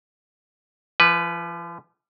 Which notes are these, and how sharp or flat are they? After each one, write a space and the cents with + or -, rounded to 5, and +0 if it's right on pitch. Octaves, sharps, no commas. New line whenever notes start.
F3 -40 B4 +0